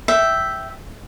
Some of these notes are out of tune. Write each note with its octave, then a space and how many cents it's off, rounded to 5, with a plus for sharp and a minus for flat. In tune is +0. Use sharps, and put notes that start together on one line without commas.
E5 +0 G5 -10